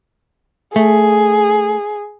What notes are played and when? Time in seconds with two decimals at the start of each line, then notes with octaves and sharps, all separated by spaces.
0.76 A3 G#4